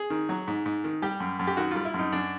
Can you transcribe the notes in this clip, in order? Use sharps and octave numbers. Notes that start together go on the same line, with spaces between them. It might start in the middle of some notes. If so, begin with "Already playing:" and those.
Already playing: G#4
D#3
F#3
G#2
G#2
D#3
G3 G4
F#2
F#2
G4
D#3 F#4
G3 F4
E4
F#2 D#4
F#2 D4